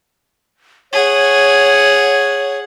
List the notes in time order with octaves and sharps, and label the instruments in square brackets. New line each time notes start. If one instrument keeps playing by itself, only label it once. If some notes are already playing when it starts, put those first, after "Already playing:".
[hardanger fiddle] G#4 F#5 [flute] C#5